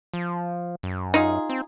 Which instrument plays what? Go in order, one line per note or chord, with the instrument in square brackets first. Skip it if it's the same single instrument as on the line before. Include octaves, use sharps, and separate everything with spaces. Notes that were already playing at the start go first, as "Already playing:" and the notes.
[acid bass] F3
F#2
[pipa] D#4 F4 G#4
[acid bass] C4